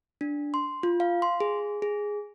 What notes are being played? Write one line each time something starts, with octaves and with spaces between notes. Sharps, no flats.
D4
C6
F4
F5
C6
G#4
G#4